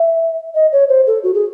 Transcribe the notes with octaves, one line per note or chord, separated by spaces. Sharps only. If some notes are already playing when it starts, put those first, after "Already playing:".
Already playing: E5
D#5
C#5
C5
A4
F#4
G#4